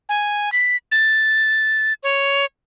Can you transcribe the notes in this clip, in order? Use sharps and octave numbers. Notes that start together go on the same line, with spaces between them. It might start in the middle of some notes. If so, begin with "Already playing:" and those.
G#5
B6
A6
C#5